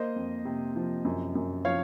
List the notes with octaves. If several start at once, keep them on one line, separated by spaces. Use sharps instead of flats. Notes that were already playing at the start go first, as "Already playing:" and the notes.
Already playing: A#3 C5 D#5
F2
C3
F3
F#2
F#2
F3 C#5 F5